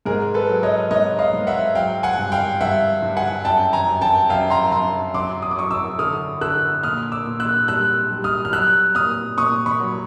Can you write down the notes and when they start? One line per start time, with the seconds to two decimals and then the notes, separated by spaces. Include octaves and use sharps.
0.06 G#2 G#4 A#4
0.34 A4 B4
0.49 F#3
0.63 C#5 D#5
0.91 G#2 C#5 D#5
1.19 D#5 F5
1.33 G#2
1.47 E5 F#5
1.75 F#3 F5 G5
2.03 F#5 G#5
2.18 G2
2.32 F5 G5
2.61 G2 E5 F#5
3.02 G2
3.17 F#5 G#5
3.45 F#2 G5 A5
3.73 G#5 A#5
3.88 F#2
4.01 G5 A5
4.29 F#2 F5 G5
4.50 A#5 C6
4.71 F#2 A#5 C6
5.14 F#3 C6 D6
5.42 D#6
5.51 D6
5.57 F#3 C#6 D#6
5.71 D6 E6
5.99 D3 D#6 F6
6.41 D3 E6 F#6
6.83 A#2 D#6 F6
7.12 D6 E6
7.26 A#2
7.40 E6 F#6
7.68 G3 E6 F#6
8.10 G3
8.24 D#6 F6
8.45 F6
8.53 F#3 E6 F#6
8.95 A#2 D#6 F6
9.38 A#2 C#6 D#6
9.66 B5 C#6
9.80 F#3